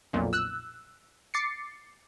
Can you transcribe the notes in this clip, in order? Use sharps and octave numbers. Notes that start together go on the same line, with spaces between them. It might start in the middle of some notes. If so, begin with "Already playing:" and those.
B1 F2 A#2
E6 F#6
D6 A6 C7 C#7